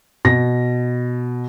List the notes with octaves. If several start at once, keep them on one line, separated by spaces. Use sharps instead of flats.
B2 A#6